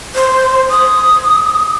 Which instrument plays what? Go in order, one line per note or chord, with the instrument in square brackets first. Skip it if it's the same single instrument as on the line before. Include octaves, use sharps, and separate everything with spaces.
[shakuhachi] C5
D#6